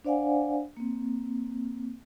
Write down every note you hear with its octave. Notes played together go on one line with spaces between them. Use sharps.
D4 C5 D5 F5 F#5 G#5
A#3 C4